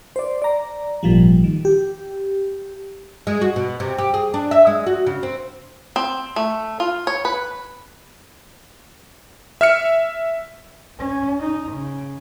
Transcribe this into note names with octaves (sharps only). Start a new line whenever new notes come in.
C5 D5
D5 A#5
G#1 A#2 F3 G3
D#3
G4
G#3
F#4
B2
C3
G4
G#4
D4
E5
G#3
F#4
C#3
C4
C4
A3
F4
C#5
B4
E5 F6 C#7
C#4
D#4
C#3